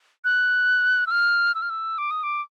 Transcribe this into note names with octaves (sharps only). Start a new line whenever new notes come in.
F#6
E6
F6
E6
F6
E6
D6
D#6
D6